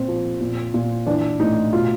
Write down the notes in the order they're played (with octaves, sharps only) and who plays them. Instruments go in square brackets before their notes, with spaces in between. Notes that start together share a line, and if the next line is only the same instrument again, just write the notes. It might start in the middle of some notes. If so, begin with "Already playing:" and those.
Already playing: [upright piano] A#2 C4
F3
A#2
A#2
E3 D4
A2 D#4
B2 F4